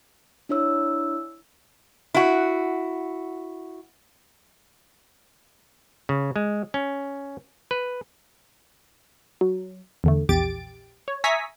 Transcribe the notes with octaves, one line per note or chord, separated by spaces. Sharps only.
D4 E4 C#5 E6
E4 F#4
C#3
G#3
C#4
B4
F#3
E2 D3 A3
A#1 E2 G4 A6 D7
C#5
E5 G#5 A#5 C#6 D#6 B6